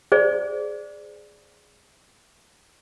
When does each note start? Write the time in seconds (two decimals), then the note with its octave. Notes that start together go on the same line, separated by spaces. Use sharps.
0.12 G#4 C5 D5